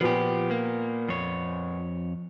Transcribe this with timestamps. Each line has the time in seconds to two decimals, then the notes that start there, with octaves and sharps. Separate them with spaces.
0.01 A#2 F3 B3 G4
0.51 A#3
1.08 F2 C#5